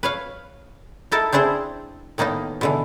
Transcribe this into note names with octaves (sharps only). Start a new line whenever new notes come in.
B4 C#5 F5
D#4 E4 A4 A#4 A5
C4 D4 E4 G#4 C5
A2 D#3 A#3 B3 D#4
B2 D3 E3